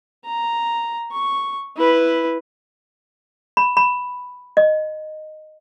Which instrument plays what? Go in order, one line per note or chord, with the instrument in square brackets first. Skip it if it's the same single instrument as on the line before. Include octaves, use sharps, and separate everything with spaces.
[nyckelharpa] A#5
C#6
E4 B4
[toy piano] B5
B5
D#5